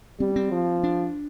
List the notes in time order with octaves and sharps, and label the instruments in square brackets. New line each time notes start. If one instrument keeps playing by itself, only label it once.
[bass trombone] G3 [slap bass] C4
[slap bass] C4
[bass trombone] F3
[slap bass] D4